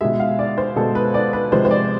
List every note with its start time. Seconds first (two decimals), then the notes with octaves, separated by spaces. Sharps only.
0.01 B2 G#3 E5
0.20 F5
0.39 D5
0.58 C5
0.76 B2 G#3 A4
0.95 B4
1.14 D5
1.33 B4
1.52 C3 F3 G#3 C5
1.65 C5
1.71 D5